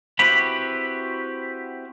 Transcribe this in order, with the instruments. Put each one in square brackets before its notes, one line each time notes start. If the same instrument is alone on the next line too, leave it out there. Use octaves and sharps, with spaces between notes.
[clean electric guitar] C4 E4 F#4 G4 B4 B5